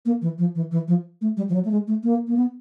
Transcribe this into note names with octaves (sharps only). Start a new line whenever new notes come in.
A#3
E3
F3
E3
E3
F3
A3
G3
F3
F#3
A3
G#3
A3
A#3
A#3
B3